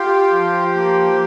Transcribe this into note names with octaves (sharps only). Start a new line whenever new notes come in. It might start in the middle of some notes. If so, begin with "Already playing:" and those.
Already playing: F4 G4
F3
A#3